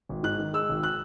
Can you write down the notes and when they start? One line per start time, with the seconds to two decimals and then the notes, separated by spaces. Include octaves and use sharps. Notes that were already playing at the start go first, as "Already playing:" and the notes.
0.09 G#1
0.23 G#2 F#6
0.39 D#3
0.53 G#3 E6
0.69 G#1
0.83 F#6